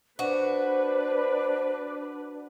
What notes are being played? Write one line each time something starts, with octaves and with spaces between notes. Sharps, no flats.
D4 F#4 B4 C5